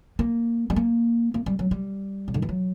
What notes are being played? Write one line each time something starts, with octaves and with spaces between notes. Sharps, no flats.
A#3
G3
A#3
A#3
G3
F#3
G3
C#3
D3
E3
F#3